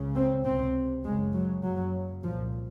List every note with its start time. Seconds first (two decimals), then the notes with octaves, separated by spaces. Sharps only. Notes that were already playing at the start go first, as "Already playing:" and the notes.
Already playing: C#2 C#3
0.15 C4
0.45 C#2 C3 C4
1.05 F#1 F#2 C#3 G#3
1.34 F#3
1.64 F#1 F#2 C#3 F#3
2.24 C2 A#2 F3